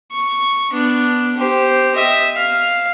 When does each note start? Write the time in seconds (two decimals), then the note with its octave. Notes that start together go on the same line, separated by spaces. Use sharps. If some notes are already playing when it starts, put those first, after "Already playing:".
0.12 C#6
0.71 B3 D4
1.37 G4 C5
1.95 D#5 E5
2.36 F5